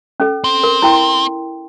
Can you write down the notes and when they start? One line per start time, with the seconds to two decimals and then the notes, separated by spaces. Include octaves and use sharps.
0.20 C#4 A4
0.44 C4
0.64 A#4
0.82 E4 G5 C6